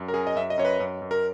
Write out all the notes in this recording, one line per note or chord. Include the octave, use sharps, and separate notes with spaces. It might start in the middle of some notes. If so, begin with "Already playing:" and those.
Already playing: F#2
A#4
F#2 G#4
D#5
F#2 E5
D#5
F#2 C#5
B4
F#2
F#2
A#4